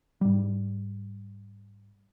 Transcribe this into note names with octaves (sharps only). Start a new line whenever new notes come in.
G#2 G3